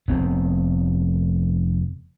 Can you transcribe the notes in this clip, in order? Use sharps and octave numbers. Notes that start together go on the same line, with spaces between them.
F1 B3 C4